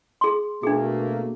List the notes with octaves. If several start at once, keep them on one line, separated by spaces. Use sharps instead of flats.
G#4 C6
B2 A3 A#3 D4 G#4